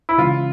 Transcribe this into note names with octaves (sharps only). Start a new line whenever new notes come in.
E4
C#3 E3 G#3 C#4 F4